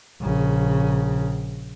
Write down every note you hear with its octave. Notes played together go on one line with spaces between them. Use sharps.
A#1 C#3